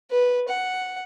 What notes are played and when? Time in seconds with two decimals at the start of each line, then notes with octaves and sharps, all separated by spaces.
0.11 B4
0.49 F#5